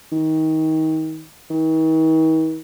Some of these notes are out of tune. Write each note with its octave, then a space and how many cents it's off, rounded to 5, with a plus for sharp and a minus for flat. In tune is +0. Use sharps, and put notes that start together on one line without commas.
D#3 +25
D#3 +45